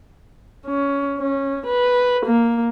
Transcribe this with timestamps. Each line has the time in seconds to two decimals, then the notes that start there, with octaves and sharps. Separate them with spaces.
0.66 C#4
1.19 C#4
1.66 B4
2.26 A#3